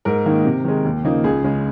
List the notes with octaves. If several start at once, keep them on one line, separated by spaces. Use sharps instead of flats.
G#2 A#4
D#3 A#3 D#4
C3
D#3 G#3
D#2
C#3 F3 A#3 D#4
C#2 G#4
C#3 G#3